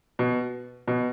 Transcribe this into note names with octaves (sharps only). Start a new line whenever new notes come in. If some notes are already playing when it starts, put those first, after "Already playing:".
B2
B2